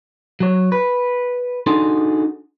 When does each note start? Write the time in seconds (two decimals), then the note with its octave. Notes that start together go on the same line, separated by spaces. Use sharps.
0.40 F#3 C#5
0.72 B4
1.67 D4 D#4 F#4 G#4 A4 C6